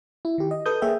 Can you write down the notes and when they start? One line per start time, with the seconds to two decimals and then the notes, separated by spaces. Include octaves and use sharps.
0.25 E4
0.38 D#3 G4
0.51 D#5
0.66 A4 B4 D#6 G6
0.82 A#3 G#4 C#5 E5 G5